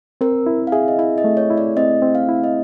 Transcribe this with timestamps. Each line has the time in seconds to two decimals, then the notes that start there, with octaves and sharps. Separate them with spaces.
0.21 C4 A#4
0.46 E4
0.67 F5
0.72 G#4 E5
0.88 D#5
0.98 E4 E5
1.18 D#5
1.24 A3
1.37 C#5
1.50 E4
1.57 D5
1.77 C4 D#5
2.02 C4
2.15 F5
2.29 E4
2.44 D#5